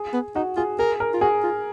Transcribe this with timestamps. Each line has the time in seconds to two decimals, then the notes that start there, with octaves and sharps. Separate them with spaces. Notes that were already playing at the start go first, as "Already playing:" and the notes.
Already playing: G#4
0.13 B3
0.35 D#4 F#4
0.56 F4 G#4
0.79 G#4 A#4
1.00 A#4
1.14 F4
1.21 F#4 G#4
1.44 F4